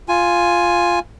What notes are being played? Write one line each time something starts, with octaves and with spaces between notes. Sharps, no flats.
F4 G#5